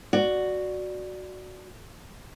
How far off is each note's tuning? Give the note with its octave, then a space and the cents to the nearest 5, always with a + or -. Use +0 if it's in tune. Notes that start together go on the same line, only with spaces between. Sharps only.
F#4 +0 D5 +5